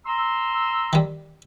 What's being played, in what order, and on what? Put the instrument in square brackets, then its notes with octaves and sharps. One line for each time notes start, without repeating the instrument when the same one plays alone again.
[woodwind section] A#5 C6 E6
[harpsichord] D#3 G3